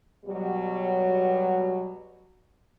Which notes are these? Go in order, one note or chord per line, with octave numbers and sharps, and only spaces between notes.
B2 F#3 G3